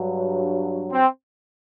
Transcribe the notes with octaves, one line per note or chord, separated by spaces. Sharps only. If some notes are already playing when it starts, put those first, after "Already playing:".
Already playing: G2 F#3
C4